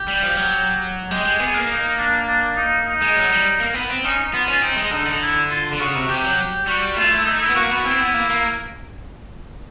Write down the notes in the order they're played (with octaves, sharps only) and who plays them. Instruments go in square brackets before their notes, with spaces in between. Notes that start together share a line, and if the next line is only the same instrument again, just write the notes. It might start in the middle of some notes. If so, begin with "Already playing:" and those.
Already playing: [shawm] G4
[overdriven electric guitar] G3
F3
F#3
[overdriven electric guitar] G#3 [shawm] G4
[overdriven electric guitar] G#3
[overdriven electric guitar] B3 [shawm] G#4
[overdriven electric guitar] A#3
[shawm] D#4
D4
D4
D#4
D#4
[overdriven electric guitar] G#3
F#3
G3
A#3
B3
C4
[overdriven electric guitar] C#4 [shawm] D#4
[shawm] D#4
[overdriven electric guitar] B3 [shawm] F4
[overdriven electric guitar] C#4 [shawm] F4
[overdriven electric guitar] C4 [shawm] D#4
[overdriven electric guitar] G#3
[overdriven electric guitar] D3 [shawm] D#4
[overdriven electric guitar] D3
[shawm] E4
F4
[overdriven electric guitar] D3
[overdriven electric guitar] C#3 [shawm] F#4
[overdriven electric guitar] C3
[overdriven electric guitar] C3 [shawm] G4
[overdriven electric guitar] F#3
[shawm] G4
G4
[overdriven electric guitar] G3 [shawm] F#4
[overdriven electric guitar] A3 [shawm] F4
[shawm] E4
D#4
E4
[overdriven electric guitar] B3
[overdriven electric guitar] A#3 [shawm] F#4
[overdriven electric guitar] B3
[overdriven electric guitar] C4 [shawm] E4
[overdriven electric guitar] B3
A#3
A#3